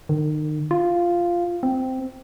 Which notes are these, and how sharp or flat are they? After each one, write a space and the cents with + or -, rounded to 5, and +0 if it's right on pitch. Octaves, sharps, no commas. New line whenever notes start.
D#3 -35
F4 -5
C4 -10